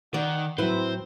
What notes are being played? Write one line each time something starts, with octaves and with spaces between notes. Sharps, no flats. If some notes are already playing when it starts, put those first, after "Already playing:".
D#3 D#4 D5 F#5
A2 F#3 C4 E4 B4 C5